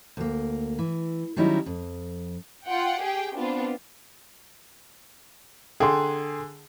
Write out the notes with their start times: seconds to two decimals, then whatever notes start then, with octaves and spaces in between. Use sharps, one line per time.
0.17 D2 A#3
0.79 E3
1.37 D#3 F#3 G3 C#4 D#4 E4
1.66 F2
2.67 F4 F#5 G5
3.02 G4 G#4 G5
3.37 B3 C4 D4 F4
5.80 D3 G#4 G5 C6